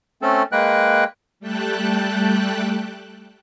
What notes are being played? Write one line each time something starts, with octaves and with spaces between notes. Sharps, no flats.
A3 C4 C#4 A4
G#3 A#3 B4 G5 F#6
G3 A3 G5 A5 F#6